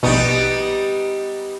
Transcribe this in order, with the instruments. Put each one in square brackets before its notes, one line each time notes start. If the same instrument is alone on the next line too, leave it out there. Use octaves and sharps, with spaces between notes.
[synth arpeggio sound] A#1 B2 [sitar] G3 B3 D#4